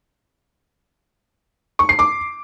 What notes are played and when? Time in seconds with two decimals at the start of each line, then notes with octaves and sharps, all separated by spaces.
1.79 C#6
1.89 C7
1.99 D6